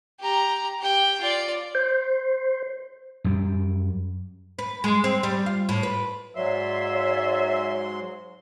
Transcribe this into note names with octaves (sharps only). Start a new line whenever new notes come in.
G4 A#5
G4 G5
F4 D5
C5
F#2 G3
B4
G#3
C4
G3
F4
A2
B4
G#2 F#3 C#5 D5 E5 F5 C6